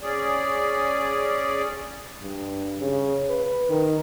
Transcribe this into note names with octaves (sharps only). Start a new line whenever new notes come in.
C#4 G#4 D5
G2
C#3
B4
D#3